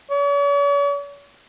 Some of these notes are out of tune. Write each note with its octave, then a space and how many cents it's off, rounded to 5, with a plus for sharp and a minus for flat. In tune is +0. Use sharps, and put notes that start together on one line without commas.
C#5 +45